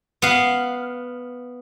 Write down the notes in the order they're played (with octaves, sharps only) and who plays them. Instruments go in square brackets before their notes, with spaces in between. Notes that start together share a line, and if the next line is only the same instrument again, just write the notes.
[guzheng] B3 F5